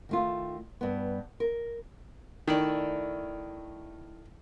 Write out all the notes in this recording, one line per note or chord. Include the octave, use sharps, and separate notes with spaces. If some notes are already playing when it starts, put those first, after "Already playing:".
D#3 A3 F4
G2 B3
A#4
D#3 A3 E4 D5